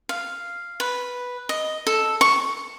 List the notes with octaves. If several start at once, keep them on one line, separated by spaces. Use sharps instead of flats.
F5
B4
D#5
A4
C#6